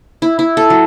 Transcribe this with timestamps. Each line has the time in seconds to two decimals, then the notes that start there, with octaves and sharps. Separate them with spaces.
0.22 E4
0.39 E4
0.57 A4
0.70 F#3